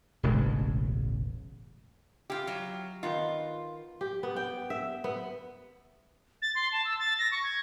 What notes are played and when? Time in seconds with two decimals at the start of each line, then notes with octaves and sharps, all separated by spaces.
0.23 E1 A1 C#3 G#3
2.30 E4 F4 G4
2.47 F#3 F5
3.03 D#3 B3 F4
4.01 G4
4.23 B3
4.36 G5
4.70 E5
5.04 B3
6.42 A6
6.55 C6
6.72 A5
6.85 E6
6.99 A6
7.19 A#6
7.32 C#6
7.43 G#6